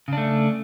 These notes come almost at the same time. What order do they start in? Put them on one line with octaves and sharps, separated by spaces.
C#3 D4 A3